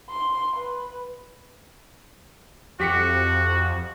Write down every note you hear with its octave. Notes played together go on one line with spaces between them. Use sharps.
C6
B4
F2 F#4 G4 B6 C#7